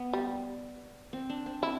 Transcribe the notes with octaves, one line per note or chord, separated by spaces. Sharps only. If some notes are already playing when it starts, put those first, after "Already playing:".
Already playing: B3
G3
C4
D4
C4
C4 E4